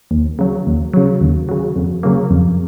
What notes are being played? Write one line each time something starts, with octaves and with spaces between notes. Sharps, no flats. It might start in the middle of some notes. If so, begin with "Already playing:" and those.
D#2
C#3 F#3
D#2
C#3 F#3
D#2
C#3 F#3
F2
C#3 F#3 A#3
F2